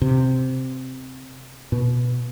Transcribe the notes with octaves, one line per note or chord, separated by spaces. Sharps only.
C3
B2